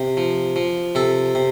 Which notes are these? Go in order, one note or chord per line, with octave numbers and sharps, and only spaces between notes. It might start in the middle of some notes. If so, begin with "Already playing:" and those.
Already playing: C3
F3
F3
C3 A4
C3